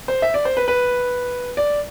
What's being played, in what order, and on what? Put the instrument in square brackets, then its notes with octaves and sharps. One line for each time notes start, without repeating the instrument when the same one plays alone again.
[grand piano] C5
E5
D5
C5
B4
B4
D5